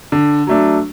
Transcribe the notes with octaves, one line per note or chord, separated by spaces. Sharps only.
D3
F#3 A3 D4